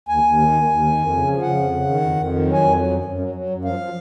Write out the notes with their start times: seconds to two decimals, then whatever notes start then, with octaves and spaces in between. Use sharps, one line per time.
0.08 D#2 G#5
0.24 D#2
0.39 D#3
0.53 D#2
0.69 D#2
0.83 D#3
0.97 F2
1.13 C#3
1.27 F3
1.42 C#3 F#5
1.57 F2
1.72 C#3
1.86 D#3
2.02 F2
2.16 F2
2.31 D#3
2.46 F#3
2.53 G#5
2.61 F2
2.76 F#3
2.90 F#2
3.05 F#2
3.20 F#3
3.35 F#3
3.50 F#2
3.64 F3 F5
3.79 F3